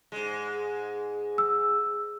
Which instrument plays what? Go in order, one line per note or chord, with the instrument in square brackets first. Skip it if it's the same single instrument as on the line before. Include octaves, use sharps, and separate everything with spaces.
[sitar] G#2 G#3
[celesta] E6